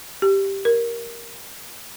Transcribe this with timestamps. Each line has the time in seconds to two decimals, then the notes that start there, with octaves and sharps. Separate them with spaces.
0.22 G4
0.65 A#4